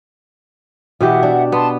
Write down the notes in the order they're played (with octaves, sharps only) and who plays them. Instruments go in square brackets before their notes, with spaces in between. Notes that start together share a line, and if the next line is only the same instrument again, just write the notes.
[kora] B2 E3 G4 [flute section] E5 F#5
[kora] D4
[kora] B3 [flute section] A5 C6